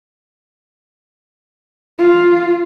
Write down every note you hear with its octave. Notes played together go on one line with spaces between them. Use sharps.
F4